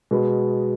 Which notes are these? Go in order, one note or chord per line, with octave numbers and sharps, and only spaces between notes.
B2 G#3 B3